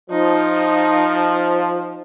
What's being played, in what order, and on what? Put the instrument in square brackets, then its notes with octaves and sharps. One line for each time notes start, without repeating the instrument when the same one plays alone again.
[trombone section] F3 [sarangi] D#4